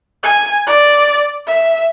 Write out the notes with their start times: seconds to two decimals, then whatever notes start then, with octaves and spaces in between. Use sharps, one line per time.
0.23 G#5
0.67 D5
1.47 E5